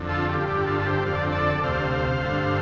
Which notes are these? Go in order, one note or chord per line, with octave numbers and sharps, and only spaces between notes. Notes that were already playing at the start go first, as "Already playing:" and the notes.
Already playing: F2 D3
F4 A4
G4
F4
G2 D3 G4
F4 A4
A4
G4 C5
F2 D3 F5
D5
C5
A4 D5
D2 C3 C5 F5
G2 D3